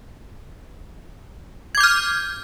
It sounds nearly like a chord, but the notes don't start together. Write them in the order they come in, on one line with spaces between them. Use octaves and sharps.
G#6 D6 G6 F6